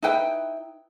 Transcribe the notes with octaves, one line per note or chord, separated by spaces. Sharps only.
D#4 E4 B4 G5